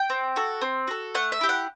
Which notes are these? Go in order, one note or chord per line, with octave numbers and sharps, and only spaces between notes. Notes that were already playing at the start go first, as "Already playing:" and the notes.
Already playing: G5
C4
F#4 A4
C4
F#4 A4
A3 F#5
E5
E4 G4
F#5